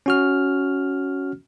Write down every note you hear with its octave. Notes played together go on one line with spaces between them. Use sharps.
C#4 F#4 F6